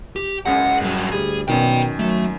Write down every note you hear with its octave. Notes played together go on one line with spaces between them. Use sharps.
G4
F#1 C#2 F#2 F#5
G2 F#3
D2 G3 G#4
F#2 B2 D#3 D5 G5
F#3 A3